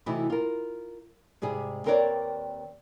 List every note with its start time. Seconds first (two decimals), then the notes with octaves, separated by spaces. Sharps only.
0.06 C3 E3 A3 D#4 E4 F#4
0.30 F4 A#4
1.42 G#2 C3 G3 G#4
1.85 D#2 C4 A#4 B4 C#5 D5